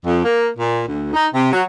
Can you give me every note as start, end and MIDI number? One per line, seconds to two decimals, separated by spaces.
0.05 0.21 41
0.24 0.48 58
0.58 0.82 46
0.88 1.11 38
1.13 1.27 63
1.34 1.50 48
1.53 1.63 54